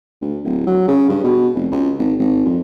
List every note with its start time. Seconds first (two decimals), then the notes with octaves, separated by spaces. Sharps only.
0.21 D2
0.44 D1
0.67 F#3
0.88 C#3
1.09 G2
1.24 B2
1.55 F1
1.72 C#2
1.99 G#1
2.19 G#1
2.45 F2